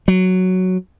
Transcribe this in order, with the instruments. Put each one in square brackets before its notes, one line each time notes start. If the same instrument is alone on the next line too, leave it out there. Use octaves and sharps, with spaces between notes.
[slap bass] F#3